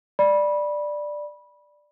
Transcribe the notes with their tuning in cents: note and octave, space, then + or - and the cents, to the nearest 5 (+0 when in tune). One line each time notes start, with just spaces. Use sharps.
D5 +10 B5 -20